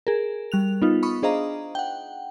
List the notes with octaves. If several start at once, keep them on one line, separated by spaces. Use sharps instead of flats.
G#4 A#4
G3 F#6 F7
B3 D#4 F4
B5 C#6 D#6
D4 G#4 C5 D#5 F5 A#5
F#5 G5